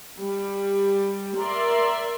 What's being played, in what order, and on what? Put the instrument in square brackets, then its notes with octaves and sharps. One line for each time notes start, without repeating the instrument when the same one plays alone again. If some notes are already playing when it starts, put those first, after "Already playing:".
[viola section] G3
A#4 D5 E5 C6